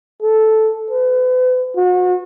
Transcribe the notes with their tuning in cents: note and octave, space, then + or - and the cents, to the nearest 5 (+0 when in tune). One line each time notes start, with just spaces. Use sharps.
A4 -5
B4 +40
F#4 -35